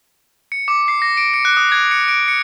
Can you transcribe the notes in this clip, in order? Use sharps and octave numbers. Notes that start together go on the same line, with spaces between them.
C#7
D6
C7
A#6
D7
C#7
F#6
D#6
G#6
C#7
D7
C#7